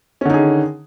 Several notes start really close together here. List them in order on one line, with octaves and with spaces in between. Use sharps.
C#4 D3 D#4 G#4 D#3